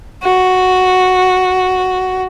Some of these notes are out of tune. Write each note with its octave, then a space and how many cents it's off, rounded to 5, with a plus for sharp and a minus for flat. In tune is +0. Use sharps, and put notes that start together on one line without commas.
F#4 +0